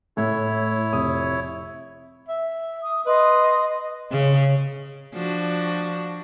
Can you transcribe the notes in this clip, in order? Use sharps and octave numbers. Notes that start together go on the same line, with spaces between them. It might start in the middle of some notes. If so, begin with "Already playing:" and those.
A2 E4 C#5
F1 D#6
E5
D#6
B4 D#5 C6 D#6
C#3
F3 D4 F#4